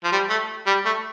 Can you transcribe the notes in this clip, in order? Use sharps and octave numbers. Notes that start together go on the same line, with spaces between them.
F3
G3
A3
G3
A3